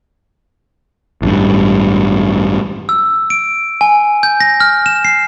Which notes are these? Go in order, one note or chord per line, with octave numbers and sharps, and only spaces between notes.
A1 G2
E6
D7
G#5
G6
A#6
F6
E7
C7